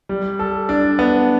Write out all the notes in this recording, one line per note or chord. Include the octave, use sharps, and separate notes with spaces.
G3
A4
D4
B3